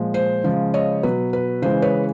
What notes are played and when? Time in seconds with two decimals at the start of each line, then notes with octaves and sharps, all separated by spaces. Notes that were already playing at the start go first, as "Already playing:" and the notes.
Already playing: A#2 F3 G#3
0.14 C5
0.44 C#3 F3 G#3
0.74 C#5 D#5
1.03 B2 F#3 B4
1.33 B4
1.62 C#3 E3 G#3 C5
1.82 B4 C#5